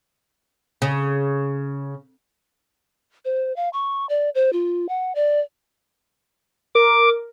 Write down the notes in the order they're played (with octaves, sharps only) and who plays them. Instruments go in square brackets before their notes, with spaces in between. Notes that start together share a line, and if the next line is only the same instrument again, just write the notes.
[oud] C#3
[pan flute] C5
F5
C#6
D5
C5
F4
F#5
D5
[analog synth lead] A#4 [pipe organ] D6